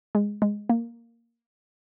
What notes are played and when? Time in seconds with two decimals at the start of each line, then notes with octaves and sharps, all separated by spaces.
0.15 G#3
0.42 G#3
0.69 A#3